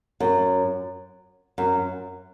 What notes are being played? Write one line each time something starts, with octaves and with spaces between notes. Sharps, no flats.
F#2
F#2